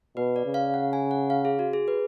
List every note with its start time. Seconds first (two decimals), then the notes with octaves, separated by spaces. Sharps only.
0.16 B2 B4
0.36 D5
0.45 C#3
0.54 F5
0.74 F#5
0.93 G#5
1.11 F#5
1.30 F5
1.45 G#4
1.59 F#4
1.73 G#4
1.88 B4